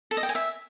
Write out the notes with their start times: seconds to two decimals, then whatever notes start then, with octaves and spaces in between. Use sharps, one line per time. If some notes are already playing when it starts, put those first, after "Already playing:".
0.11 A4
0.17 D#5
0.23 G5
0.29 G#5
0.35 E5